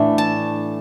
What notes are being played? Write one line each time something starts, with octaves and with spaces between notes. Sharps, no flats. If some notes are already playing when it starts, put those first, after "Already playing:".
Already playing: A2 E3 A3 D4
A5